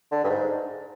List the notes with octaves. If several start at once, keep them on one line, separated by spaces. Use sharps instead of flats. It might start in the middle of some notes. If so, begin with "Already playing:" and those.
D3
G2
G#2